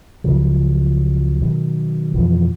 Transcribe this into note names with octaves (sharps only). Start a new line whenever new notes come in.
C#2 C#3 F3 F#3
B2 D#3 F#3
F2 B2 E3 F3